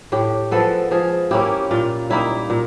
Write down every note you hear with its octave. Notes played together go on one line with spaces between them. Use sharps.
A2 G4
F3 G#3 B3 A4
F3 G#4
A#3 C#4 E4 G4
A#2 F4
G3 A#3 D#4 E4
A#2